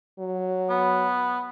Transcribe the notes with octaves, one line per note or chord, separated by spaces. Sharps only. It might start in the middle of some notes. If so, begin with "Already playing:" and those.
F#3
B3